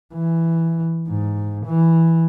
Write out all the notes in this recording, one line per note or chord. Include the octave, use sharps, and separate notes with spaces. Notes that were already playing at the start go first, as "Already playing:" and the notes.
E3
G#2
E3